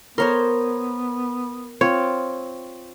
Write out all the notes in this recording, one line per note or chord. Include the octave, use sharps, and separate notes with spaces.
B3 A#4 C5 C#5 C6
C4 F4 C#5